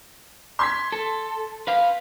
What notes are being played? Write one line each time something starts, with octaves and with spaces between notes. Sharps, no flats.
C6 G#6 B6
A4
B4 F5